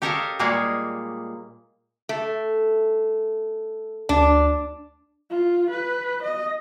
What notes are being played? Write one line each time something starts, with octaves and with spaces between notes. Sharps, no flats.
G4 A4 A#4 C#5 D#5 F5
A#2 G3 G#3 A#3 G#4 C#5
A3
D2 D4
F4
B4
D#5